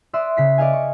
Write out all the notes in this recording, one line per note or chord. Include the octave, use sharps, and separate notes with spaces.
D5 E5 C6 D#6 E6 F#6
C#3 B6 C7
D5 D#5 F5 G#5
C#6